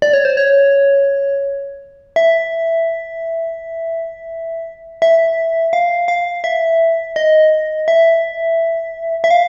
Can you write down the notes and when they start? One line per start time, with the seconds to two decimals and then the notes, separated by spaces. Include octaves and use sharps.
0.02 D5
0.13 C#5
0.25 C5
0.37 C#5
2.16 E5
5.02 E5
5.73 F5
6.08 F5
6.44 E5
7.16 D#5
7.88 E5
9.24 E5
9.31 F5